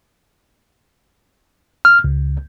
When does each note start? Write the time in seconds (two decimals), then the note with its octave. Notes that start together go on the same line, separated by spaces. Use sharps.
1.85 F6
2.04 C#2